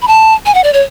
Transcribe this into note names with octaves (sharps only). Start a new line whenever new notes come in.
B5
A5
G#5
F#5
D5
C#5